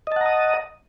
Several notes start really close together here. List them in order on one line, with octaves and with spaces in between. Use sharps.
D#5 A5 F#5 A#5 D#6